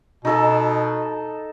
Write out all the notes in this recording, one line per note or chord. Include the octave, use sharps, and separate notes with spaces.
B2 D#4 A4 A5